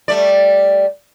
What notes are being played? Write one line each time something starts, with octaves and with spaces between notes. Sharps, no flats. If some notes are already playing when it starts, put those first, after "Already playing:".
G3 A3 D5